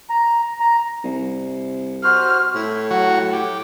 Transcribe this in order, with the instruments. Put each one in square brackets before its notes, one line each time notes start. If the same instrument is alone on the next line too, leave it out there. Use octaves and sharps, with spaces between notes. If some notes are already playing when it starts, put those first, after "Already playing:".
[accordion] A#5
A#5
[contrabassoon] C2
[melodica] F#4 C5 [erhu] F6
[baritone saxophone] A2
[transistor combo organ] F#3 F#4
G4